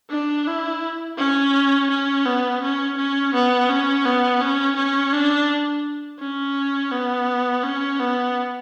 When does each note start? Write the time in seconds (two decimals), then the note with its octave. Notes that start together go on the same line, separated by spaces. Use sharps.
0.10 D4
0.47 E4
1.18 C#4
1.90 C#4
2.25 B3
2.62 C#4
2.97 C#4
3.34 B3
3.70 C#4
4.05 B3
4.41 C#4
4.76 C#4
5.13 D4
6.20 C#4
6.91 B3
7.63 C#4
7.99 B3